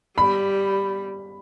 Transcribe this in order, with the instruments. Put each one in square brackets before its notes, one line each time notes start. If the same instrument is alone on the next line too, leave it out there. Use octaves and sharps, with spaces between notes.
[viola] G3 [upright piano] B5